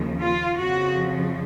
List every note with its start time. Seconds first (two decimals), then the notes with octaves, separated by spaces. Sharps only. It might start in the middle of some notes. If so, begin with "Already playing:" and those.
Already playing: D#2 C#3 F3
0.22 F4
0.60 F2 C#3 F3 F#4